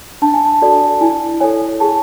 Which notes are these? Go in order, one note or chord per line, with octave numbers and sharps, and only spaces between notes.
D4 A5
G#5
A5
F#4 A4 D5
E4 G#5
A4 C#5 G#5
G#4 A5